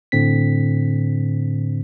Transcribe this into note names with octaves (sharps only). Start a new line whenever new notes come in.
A2 D3 C4 B6